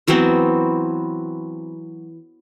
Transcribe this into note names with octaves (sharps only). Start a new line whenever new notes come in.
E3 F#3 B3 C4